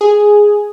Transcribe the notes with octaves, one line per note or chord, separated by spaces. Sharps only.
G#4